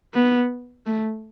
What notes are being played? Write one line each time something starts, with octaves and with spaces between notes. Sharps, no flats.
B3
A3